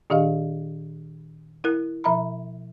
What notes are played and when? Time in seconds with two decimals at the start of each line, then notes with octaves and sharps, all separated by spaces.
0.10 A#2 D#3 D4 G4 D#5 F5
1.64 E4 A#4 F#6
2.04 B2 F3 E5 A#5 B5